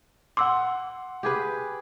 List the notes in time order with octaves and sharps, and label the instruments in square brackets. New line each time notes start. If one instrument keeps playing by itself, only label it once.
[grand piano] F#5 C6 [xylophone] D6 E6
[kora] G4 G#4 B4